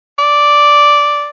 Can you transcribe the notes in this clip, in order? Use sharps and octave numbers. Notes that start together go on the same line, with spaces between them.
D5